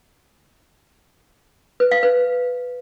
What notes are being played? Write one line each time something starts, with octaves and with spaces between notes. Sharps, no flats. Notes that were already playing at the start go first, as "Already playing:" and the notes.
B4
F5
B4